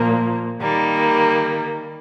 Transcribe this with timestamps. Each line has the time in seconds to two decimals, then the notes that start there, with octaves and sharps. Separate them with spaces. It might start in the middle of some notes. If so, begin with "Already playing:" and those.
Already playing: A#2 F3 A#3
0.61 D#3 G3 A#3